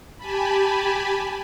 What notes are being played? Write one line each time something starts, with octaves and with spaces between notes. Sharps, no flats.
G4 G#5 A5 B5